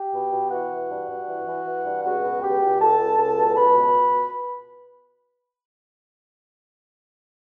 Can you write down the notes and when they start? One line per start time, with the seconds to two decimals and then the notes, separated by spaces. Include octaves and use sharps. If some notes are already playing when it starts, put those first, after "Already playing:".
Already playing: G4 G5
0.12 B2
0.31 B2
0.50 E3 F#4 F#5
0.70 E3
0.89 G2
1.09 G2
1.27 E3
1.46 E3
1.65 E3
1.84 G2
2.03 C#2 F#4 F#5
2.22 B2
2.41 C#2 G4 G5
2.61 C#2
2.79 C#2 A4 A5
2.99 C#2
3.18 C#2
3.37 B2
3.52 A5
3.56 C#2 B4 B5
3.75 B2